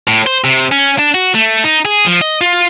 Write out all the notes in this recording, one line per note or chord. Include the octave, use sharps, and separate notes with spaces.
A2
C5
C3
C#4
D4
F#4
A3
D#4
G#4
F3
D#5
F4